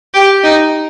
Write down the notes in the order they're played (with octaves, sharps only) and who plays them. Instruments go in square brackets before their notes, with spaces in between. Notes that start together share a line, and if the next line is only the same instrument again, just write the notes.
[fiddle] G4
D#4